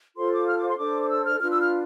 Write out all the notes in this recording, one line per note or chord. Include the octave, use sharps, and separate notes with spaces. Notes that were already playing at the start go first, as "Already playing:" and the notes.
F4 A4 C5 C6
D6
F6
D6
C6
D4 A4 C5 D6
D6
E6
F6
D4 F4 B4 F6
E6
F6